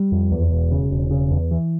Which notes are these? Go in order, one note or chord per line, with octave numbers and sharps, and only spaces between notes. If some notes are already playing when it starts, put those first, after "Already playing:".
Already playing: G3
F2
E2
E1
C#3
E1
C#3
E2
E3